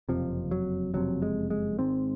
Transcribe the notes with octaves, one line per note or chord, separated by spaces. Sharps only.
F#1 F2 C3 F3
F#3
F#1 F2 C3 F#3
G#3
G#3
G#1 G#2 C4